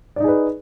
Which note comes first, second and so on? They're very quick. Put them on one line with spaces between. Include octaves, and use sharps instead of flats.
D5 D#4 G#4 B4